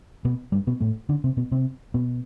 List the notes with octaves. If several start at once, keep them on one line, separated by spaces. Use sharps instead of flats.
B2 B3
G2 G3
B2 B3
A2 A3
D3 D4
C3 C4
B2 B3
C3 C4
B2 B3